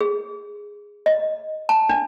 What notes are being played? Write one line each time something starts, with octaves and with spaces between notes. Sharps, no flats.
G#4
D#5
A5
D4